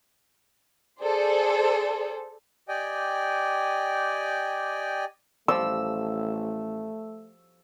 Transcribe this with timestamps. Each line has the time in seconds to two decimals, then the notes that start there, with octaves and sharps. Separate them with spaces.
1.00 G#4 A4 C5 D5
2.68 G4 D5 D#5 G5 G#5
5.48 A1 F3 G3 A3 E6